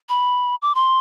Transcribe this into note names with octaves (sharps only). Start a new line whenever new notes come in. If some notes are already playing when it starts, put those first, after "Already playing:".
B5
D6
C6